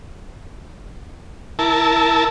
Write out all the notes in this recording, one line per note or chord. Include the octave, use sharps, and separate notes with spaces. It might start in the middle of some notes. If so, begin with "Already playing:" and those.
E4 A#4 A5